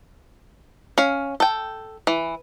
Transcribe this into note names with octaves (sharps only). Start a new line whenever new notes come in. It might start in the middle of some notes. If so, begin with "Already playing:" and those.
C#4 F5
A4 G5
E3